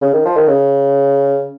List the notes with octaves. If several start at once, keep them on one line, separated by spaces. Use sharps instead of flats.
C#3
D#3
F3
D#3
C#3